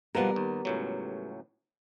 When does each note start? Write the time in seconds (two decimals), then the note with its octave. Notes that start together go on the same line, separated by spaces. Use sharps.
0.15 B2 F3 G3 B3 A#4 F#5
0.36 D#2
0.65 C#2 A2 F#3